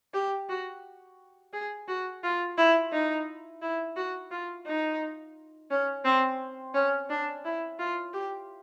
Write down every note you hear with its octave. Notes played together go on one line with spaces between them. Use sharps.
G4
F#4
G#4
F#4
F4
E4
D#4
E4
F#4
F4
D#4
C#4
C4
C#4
D4
E4
F4
G4